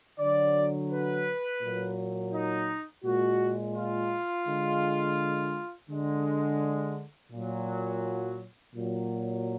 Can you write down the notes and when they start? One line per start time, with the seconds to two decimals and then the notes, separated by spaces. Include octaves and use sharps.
0.19 D3 F#3 D5
0.90 B4
1.62 A#2 F#3
2.33 D#4
3.04 A#2 G#3 F#4
3.75 F4
4.47 D3 G#3
5.90 D3 G#3
7.31 A#2 F#3
8.74 A#2 F#3